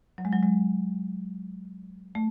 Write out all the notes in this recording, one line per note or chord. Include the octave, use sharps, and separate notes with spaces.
F#3
G#3
F#3
G#3
A3